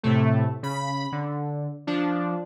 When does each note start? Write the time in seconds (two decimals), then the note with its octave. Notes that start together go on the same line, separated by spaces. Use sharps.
0.03 A2 C3 A3
0.63 C#3 B5
1.12 D3
1.87 F3 D4